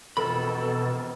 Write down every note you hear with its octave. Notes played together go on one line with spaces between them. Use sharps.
E1 F2 B2 A4 A#4 B5